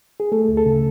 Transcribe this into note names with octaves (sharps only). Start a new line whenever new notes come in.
G#4
A3 A4
D2
A4
C#3